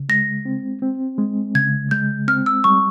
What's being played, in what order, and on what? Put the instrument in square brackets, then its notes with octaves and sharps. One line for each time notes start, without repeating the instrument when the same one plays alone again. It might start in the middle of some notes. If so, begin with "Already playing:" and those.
Already playing: [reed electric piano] C#3
[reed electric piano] G#3 [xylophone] A#6
[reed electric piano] C4
C4
G#3
[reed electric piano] C#3 [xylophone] G#6
[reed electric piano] G#3 [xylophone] G6
[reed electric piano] C4 [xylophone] F6
[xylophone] E6
[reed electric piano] G3 [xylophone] C#6